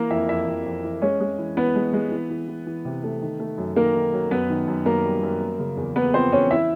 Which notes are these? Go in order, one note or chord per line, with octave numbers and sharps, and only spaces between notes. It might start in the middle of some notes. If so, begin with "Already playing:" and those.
Already playing: E3 A#3 A#4
F2 E4 E5
F2 E4 E5
F2
F2
E3
G#3 C#4 C#5
G#3
E3
E3 B3 B4
G#3
G#3
E3
E3
E3
E3
C3
A3
D#3
A3
F#2
D#3 A#3 A#4
D#3
F#3
F#2 B3 B4
D#3
F#2
F#2 A#3 A#4
G3
F#2
A#3
C#3
E2
A#3 B3 B4
F3 C4 C5
E2 C#4 C#5
E3 E4 E5